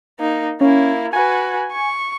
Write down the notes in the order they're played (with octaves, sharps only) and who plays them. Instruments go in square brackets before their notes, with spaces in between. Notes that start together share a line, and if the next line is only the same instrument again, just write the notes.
[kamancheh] A#3 D#4
[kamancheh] A#3 E4 [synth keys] C#4
[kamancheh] F#4 B4 [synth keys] G#5
[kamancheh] C#6